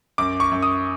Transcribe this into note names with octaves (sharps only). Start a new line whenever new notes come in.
F#2 D6
C#6
F#2
D#6